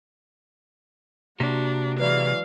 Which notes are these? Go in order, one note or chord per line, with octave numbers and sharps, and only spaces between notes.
C3 A#3 D4 F#4 G4
E3 F#3 G#3 B4 D5 F5